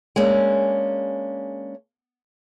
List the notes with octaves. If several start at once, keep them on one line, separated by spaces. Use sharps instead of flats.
G#3 A#3 C#4 D4